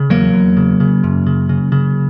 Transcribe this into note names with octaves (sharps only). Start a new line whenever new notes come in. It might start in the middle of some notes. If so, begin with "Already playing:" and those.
Already playing: C#3
E2 F#3 A#3
E2
C#3
C#3
F#2
C#3
C#3
C#3